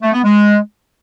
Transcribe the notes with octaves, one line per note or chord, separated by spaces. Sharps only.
A3
B3
G#3